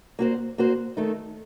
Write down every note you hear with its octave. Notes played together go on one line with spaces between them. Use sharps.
A#3 F#4 C5
A#3 F#4 C5
D#3 A3 D#4 A4